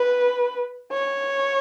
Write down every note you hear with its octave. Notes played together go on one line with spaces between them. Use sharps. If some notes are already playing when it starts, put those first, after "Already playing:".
Already playing: B4
C#5